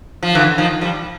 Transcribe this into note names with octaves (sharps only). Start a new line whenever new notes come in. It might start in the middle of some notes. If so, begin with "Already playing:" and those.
F3
D3 E3
D#3 F3
F3 G3